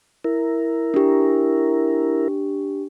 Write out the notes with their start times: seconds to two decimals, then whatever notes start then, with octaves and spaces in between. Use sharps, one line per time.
0.24 E4 A#4
0.94 D4 G4